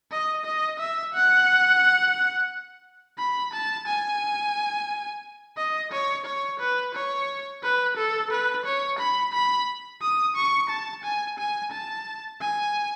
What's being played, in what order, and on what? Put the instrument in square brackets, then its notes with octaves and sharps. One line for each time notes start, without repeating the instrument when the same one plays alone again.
[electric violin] D#5
D#5
E5
F#5
B5
A5
G#5
D#5
C#5
C#5
B4
C#5
B4
A4
B4
C#5
B5
B5
D#6
C#6
A5
G#5
G#5
A5
G#5